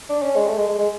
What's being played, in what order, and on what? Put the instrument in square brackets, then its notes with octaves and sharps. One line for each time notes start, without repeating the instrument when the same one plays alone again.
[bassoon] D4
C#4
G#3
A3
G#3
G#3
G#3